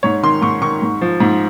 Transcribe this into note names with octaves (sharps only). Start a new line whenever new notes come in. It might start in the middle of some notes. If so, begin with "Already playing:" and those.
G#2 C#5
D#3 C6
G#2 C#6
D#3 C#6
G#2
F3
G#2